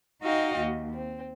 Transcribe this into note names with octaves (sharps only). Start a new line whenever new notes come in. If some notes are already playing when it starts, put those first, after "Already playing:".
D#4 F#4 D#5 F5 G5
D#2
C4